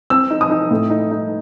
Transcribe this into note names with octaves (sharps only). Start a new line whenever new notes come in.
C4 E6
D#4
D#6
D#4
A2
D#4
D#4